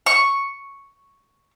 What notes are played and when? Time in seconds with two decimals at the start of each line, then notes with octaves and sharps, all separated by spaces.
0.06 C#6